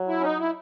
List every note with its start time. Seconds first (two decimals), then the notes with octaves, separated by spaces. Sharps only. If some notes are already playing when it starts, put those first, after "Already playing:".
Already playing: F#3
0.08 E4
0.20 C#4
0.24 D#4
0.40 E4